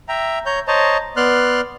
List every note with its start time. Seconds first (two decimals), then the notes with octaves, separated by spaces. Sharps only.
0.08 E5 G5 A#5
0.46 C#5 A#5 G6
0.68 C5 C#5 D#5 A5 A#5
1.17 B3 D5 C6 F6 F#6